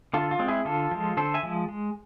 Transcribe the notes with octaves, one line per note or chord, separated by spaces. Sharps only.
D3 F4 A4
F4
G#3 C4
E4 G#4
D3 F4 A4
F3 G#3
D3 A4 C5
E5 G#5
F3 G#3
G#3